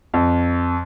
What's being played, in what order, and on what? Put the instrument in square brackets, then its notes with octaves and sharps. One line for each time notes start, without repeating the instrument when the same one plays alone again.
[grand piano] F2